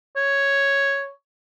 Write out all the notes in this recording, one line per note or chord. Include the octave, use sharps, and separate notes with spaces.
C#5